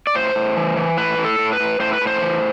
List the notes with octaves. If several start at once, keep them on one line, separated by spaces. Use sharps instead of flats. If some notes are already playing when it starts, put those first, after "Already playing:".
D5
A2 C5
A2
E3
E3
A2 B4
A2
A4
A2
B4
A2
A2 C5
B4
A2
C5
E3